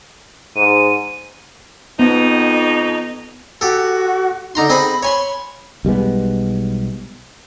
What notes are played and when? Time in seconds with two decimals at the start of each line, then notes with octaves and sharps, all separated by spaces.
0.56 G#2 D#7
1.99 F2 B3 D#4
3.61 F#4 G4 A4
4.55 D3 D#4 A#5 C6
4.69 C4 D#4 G#4 B5
5.03 C#5 G#5 B5 C6
5.85 B1 G3 G#3 B3